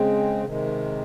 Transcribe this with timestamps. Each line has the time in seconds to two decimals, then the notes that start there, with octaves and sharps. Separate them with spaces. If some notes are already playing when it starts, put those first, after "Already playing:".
Already playing: C#3 G#3 C4
0.45 C3 D#3 G#3